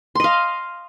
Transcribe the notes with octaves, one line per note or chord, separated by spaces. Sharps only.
D#5 F5 C6